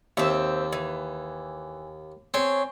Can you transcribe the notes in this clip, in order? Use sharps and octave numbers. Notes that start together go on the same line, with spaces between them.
D#2 C4 E5
E3
C4 G#4 C#5